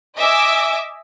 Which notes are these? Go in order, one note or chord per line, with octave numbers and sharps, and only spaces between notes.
D#5 E5 G#5 D6 E6